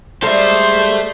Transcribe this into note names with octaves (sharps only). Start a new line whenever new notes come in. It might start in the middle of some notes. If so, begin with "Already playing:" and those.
G3 G#3 A4 C5 E5